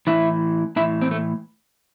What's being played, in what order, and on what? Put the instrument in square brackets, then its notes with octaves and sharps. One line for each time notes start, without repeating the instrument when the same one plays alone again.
[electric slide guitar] A2 E3 E4
A2 E4
E3
C4
A3